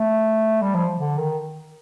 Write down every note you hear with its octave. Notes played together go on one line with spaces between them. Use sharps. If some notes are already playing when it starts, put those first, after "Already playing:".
Already playing: A3
G3
F3
D3
D#3